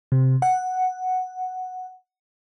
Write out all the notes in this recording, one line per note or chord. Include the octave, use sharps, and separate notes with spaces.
C3
F#5